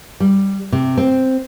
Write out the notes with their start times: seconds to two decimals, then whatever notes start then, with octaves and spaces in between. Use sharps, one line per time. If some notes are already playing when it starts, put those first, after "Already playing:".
0.20 G3
0.72 C3
0.97 C4